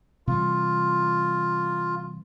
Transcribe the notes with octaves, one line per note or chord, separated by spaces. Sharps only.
C3 E3 G3 F4